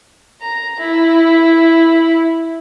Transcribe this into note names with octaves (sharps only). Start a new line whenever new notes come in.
A#5
E4